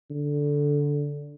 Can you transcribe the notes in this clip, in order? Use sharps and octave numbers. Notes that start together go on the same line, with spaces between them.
D3